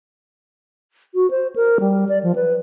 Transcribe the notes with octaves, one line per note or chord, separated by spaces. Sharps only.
F#4
C5
A#4
G3
D5
F3
B4